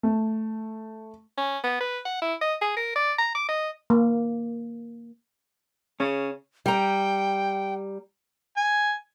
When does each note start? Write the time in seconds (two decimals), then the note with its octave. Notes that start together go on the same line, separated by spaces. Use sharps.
0.03 A3
1.37 C#4
1.64 B3
1.80 B4
2.05 F#5
2.22 E4
2.41 D#5
2.61 G#4
2.76 A#4
2.96 D5
3.18 A#5
3.35 D6
3.49 D#5
3.90 A#3
6.00 C#3 C#4
6.66 G3 G5 A#5
8.57 G#5